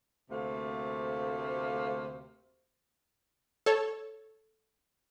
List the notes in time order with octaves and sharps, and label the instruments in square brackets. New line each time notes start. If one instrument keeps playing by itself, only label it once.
[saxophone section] D2 C3 A3 A#3 C5 F5
[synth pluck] A4 C#5